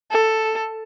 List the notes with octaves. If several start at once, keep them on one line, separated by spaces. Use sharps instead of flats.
A4